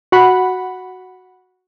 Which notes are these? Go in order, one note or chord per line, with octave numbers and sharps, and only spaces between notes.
F#4 F#5 B5